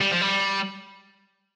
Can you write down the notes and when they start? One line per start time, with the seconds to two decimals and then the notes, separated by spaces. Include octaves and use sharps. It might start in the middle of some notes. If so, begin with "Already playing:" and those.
0.01 G3
0.12 F3
0.22 G3